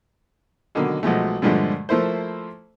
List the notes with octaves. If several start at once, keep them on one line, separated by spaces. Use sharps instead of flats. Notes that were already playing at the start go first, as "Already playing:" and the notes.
B2 D3 D#3 F#3 A#3
B1 F3 G#3 A3
G2 A#2 D3 F3 G#3 A3
F3 A3 A#3 E4 C5